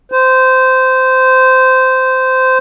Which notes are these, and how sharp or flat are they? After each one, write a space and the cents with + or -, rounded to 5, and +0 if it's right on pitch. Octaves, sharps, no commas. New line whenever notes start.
C5 -15